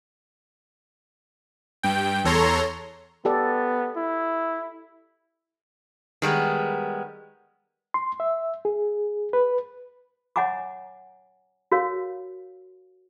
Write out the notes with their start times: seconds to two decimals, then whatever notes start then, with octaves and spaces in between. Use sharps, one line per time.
1.83 G2 G5
2.25 E2 A4 C#5 A#5 C6
3.25 B3 G4 A4 D5
3.96 E4
6.22 D#3 G3 G#3 B3
7.94 C6
8.20 E5
8.65 G#4
9.33 B4
10.36 C#5 D#5 F#5 G#5 A#5 D6
11.72 F#4 A#4 C#5 F5